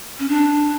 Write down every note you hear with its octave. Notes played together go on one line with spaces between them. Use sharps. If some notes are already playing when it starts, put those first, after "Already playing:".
C#4
D4